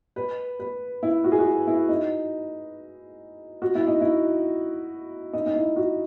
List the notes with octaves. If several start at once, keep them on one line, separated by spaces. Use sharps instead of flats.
B4
B4
E4
F#4
G#4
F#4
E4
D#4
F#4
E4
D#4
E4
D#4
D#4
E4
F#4